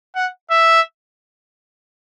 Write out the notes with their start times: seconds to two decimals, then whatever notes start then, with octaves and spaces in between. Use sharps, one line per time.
0.16 F#5
0.51 E5